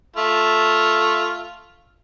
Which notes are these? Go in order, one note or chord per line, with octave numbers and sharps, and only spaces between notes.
A3 F4